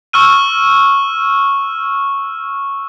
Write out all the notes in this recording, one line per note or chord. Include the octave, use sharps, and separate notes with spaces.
C#6 E6 F6 D#7